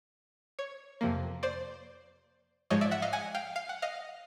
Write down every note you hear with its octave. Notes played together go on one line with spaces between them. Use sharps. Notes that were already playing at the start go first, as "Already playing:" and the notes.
C#5
F2 C3 F3 A#3
C5 D5
G#2 F3 G#3 C#5 D#5
D5 E5
E5 F#5
D#5 F5
F#5 G#5
F5 G5
F5
F#5
D#5 F5